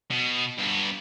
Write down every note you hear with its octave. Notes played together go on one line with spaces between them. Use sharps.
B2
G2 B3